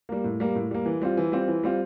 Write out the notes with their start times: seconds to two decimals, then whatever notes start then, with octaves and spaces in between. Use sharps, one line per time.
0.09 G3 A#3
0.24 A2
0.40 G3 A#3
0.55 A2
0.71 G3 A#3
0.86 E3
1.01 G3 C4 F4
1.17 E3
1.32 G3 C4 F4
1.48 E3
1.63 G3 C4 F4